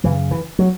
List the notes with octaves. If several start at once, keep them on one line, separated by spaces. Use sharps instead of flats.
F#2 C#3 E3
E3
F#3